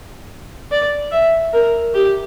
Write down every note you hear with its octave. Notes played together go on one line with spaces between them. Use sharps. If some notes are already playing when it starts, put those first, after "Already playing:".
D5
E5
A#4
G4